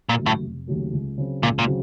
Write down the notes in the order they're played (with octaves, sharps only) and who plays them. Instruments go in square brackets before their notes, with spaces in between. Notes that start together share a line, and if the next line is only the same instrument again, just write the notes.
[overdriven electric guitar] A#2
[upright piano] D#2 C#3 F#3 A3
[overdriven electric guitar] A2
[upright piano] F1
D#2 C#3 F#3 A3
C#2
C#3 F#3 C4
[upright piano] C#2 [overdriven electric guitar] A#2
[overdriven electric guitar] A#2
[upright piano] C#3 F#3 C4